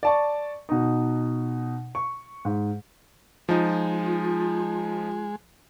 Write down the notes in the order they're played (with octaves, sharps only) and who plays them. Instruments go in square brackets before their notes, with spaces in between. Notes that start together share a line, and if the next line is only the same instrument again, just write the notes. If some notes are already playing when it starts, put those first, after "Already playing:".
[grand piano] D5 A5 C#6
B2 D#4
C#6
G#2
[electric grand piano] F3 D#4 [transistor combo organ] G#3 [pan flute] F4